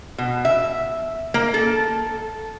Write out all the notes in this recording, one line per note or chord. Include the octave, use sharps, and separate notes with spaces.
B2
E5
A#3
A4